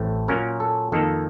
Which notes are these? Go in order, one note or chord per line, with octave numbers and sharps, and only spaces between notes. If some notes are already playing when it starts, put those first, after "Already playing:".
Already playing: A1 A2 A3 C4
A#2 F#3 A#3 C#4 A#4
A4
F2 D#3 A#3 A4